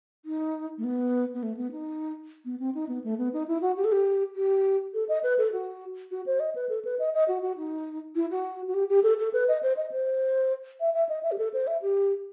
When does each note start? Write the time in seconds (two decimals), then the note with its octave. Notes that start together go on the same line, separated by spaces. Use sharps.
0.25 D#4
0.78 A3
0.84 B3
1.34 B3
1.43 A3
1.57 B3
1.72 D#4
2.45 B3
2.60 C4
2.75 D#4
2.88 B3
3.04 A3
3.18 B3
3.33 D#4
3.48 E4
3.61 F#4
3.77 G4
3.84 A4
3.92 G4
4.35 G4
4.94 A4
5.09 D#5
5.23 B4
5.38 A4
5.52 F#4
6.11 F#4
6.26 C5
6.40 D#5
6.55 B4
6.69 A4
6.85 B4
6.99 D#5
7.14 D#5
7.28 F#4
7.42 F#4
7.57 D#4
8.15 E4
8.31 F#4
8.68 F#4
8.74 G4
8.89 G4
9.03 A4
9.19 A4
9.33 B4
9.48 D#5
9.63 C5
9.77 D#5
9.91 C5
10.80 E5
10.94 E5
11.09 D#5
11.23 E5
11.31 G4
11.38 A4
11.53 C5
11.67 E5
11.82 G4